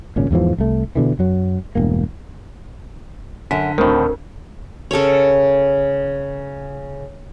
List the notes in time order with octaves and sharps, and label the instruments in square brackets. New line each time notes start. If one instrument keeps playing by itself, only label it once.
[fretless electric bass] G#1 A#2 C#3 C#4
E2 G#2 E3 F3
C2 A3
B2 D3 E3
F#2 F#3
E1 G2 A#3
[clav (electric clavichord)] F#2 [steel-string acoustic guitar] D3 [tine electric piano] B6
[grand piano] D2 C4 D4 [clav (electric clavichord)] A2 D#3 [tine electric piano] A#4
[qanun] C#3 A4 A#4 C#5